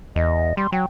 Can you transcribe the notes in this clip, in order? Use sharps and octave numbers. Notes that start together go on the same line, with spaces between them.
E2 D#5
G3 C6
F#3 G5